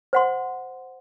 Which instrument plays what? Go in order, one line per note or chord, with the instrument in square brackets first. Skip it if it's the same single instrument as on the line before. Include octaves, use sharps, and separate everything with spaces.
[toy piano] C5 F#5 C6